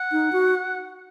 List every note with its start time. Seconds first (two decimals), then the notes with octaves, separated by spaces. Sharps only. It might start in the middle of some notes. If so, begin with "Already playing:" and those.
Already playing: F#5
0.12 D#4
0.32 F#4